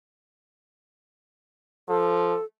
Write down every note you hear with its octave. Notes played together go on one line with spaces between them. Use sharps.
F3 A4